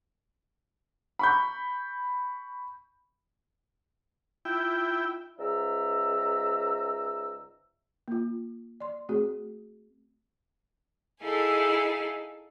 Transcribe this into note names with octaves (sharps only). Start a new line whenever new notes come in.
B5 C#6 G6
E4 F4 G5
C#2 G#2 D5 E5 A#5 E6
A#3 F4
D5 C6
A3 C4 F#4 G#4
D#4 E4 G#4 A4 F5 G#5